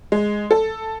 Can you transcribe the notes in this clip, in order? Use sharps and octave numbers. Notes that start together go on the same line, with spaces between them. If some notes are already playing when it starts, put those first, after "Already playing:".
G#3
A4